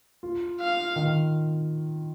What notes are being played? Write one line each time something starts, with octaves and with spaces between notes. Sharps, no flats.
F4
F5
D#3